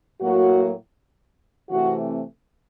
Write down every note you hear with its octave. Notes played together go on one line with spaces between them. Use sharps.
A2 F#3 A#3 F#4
C3 E3 A3 C4 F#4